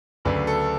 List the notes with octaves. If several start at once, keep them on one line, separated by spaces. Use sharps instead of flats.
D2 C#3 F#3 A3 D4 B4
A4